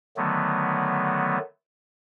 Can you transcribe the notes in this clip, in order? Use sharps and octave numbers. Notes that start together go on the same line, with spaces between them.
D3 D#3 F#3 A3 B3